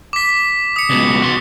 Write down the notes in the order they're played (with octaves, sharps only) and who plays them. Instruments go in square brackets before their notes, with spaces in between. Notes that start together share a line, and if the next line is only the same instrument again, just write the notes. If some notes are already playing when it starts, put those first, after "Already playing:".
[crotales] D6 B6
D#6 C#7
[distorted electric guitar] C#2 B2
F#4 C6